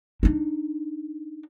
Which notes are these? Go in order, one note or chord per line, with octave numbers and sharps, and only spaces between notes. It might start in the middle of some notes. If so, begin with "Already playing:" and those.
D4 D#4